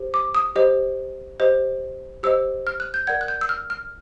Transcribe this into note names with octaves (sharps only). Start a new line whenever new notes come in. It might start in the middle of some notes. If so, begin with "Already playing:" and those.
Already playing: G4 C5
D6
D#6
G4 C5 D#5
G4 C5 D#5
G4 C5 D#5 E6
F6
F#6
G6
A#4 D5 F#5 G#6
F#6
G6
E6
F6
F6